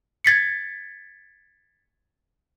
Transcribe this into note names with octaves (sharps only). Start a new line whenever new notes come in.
G#6 A6 B6 C#7